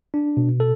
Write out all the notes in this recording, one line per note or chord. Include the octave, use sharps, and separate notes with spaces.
D4
B2
A4